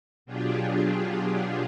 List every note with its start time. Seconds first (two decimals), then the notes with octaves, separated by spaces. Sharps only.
0.26 B2 F#3 D4 F4 G4 G#4